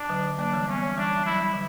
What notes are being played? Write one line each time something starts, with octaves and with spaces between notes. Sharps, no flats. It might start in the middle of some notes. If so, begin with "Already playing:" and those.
Already playing: D4
D3 F#3
F#3 A#3 D4
E3 G3
G3 B3 C#4
E3 G3 D4
F#3 E4
G3
D3 F#3